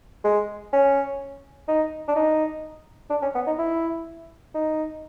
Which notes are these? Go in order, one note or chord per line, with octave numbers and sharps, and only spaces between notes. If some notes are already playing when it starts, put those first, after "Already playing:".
G#3
C#4
D#4
D4
D#4
D4
C#4
B3
D#4
E4
D#4